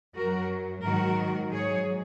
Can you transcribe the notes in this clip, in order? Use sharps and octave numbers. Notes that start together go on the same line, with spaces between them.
F#2 F#3 F#4 A#4
G#2 D#3 F#3 F#4 A#4
G#2 F#3 G#4 C#5